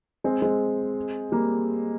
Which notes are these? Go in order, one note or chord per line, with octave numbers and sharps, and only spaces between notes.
G#3 C4
G#3 C4
G3 A#3